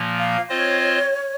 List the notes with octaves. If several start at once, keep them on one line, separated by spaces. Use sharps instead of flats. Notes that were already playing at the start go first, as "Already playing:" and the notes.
Already playing: A#2 F3 A#3
F5
C4 F4 C5 C#5 D#5